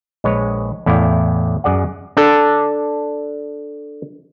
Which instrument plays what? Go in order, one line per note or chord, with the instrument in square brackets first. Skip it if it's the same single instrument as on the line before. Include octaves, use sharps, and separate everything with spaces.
[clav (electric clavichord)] A#1 G#3 B4 C#5
E2 A2 E4 D5 F5 G5
F#2 G#4 D5 F#5
D4 A4